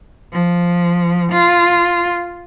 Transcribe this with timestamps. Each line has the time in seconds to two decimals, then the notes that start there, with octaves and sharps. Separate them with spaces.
0.32 F3
1.31 F4